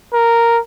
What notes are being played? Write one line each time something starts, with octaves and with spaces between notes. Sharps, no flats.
A#4